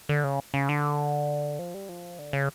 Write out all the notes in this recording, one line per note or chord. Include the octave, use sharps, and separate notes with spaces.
D3
C#3
C#3
D3
F3
G3
F3
D3
C#3